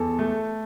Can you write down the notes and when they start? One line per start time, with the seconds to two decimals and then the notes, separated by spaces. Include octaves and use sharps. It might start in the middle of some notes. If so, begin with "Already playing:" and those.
Already playing: E2 A4
0.19 A3